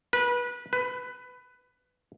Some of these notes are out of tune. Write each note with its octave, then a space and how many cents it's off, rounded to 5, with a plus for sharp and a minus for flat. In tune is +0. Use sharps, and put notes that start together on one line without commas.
B4 -25
B4 +15